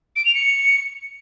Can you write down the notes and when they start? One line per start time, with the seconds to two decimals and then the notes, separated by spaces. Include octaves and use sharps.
0.16 D7
0.25 F7
0.34 C#7